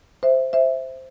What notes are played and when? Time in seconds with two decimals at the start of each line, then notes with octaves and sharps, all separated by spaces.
0.23 C5 E5
0.53 C5 E5